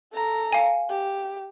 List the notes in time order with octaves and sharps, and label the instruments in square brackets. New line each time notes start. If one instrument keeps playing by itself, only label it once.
[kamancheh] A4 A#5
[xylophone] F5 G#5
[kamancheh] G4